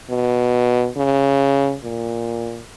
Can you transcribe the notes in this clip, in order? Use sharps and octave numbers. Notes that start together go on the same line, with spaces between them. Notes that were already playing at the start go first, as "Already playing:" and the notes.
B2
C#3
A#2